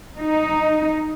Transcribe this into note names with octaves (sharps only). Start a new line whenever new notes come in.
D#4